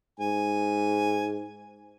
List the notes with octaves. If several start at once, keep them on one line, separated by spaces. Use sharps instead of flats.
G#2 G#5